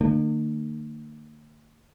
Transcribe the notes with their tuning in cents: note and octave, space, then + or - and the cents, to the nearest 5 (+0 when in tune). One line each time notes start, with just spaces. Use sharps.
D3 +45 A#3 -45